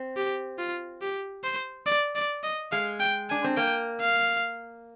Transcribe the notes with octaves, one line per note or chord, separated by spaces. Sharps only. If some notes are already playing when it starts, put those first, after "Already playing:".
Already playing: C4
G4
F4
G4
C5
D5
D5
D#5
G#3 F5
G5
D4 G#5
C4
A#3 G5
F5